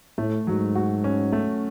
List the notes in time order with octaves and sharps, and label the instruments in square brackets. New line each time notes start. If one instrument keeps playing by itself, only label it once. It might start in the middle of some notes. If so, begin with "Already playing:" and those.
[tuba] A2 [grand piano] A3
[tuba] G#2 [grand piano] F#3
[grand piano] F#4
C#4
A3